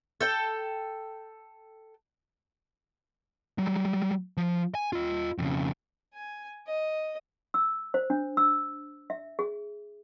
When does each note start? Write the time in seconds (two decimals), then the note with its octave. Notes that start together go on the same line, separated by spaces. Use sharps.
0.21 A4 G5
3.58 F#3 G3
4.37 F3
4.75 G#5
4.93 F4 D#5
5.38 F2 C#3
6.14 G#5
6.67 D#5
7.54 E6
7.94 C5
8.10 D4
8.37 E6
9.10 E5
9.39 G#4